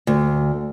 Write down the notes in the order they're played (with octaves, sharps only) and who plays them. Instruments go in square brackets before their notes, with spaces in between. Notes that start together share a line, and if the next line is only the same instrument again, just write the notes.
[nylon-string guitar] D2